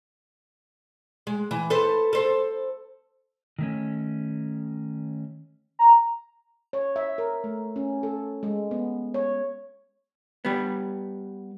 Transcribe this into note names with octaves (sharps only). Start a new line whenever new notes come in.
G#3
E3
A4 B4 C5
A4 C5
D#3 A3 C#4
A#5
C#5
E5
A#4
A3
C#4
A4
G#3
B3
C#5
G3 B3